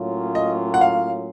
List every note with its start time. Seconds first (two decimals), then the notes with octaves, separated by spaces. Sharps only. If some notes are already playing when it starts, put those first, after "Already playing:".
Already playing: A2 F#3 A#3 C#4 F4
0.35 D#5
0.74 F#5
0.81 F5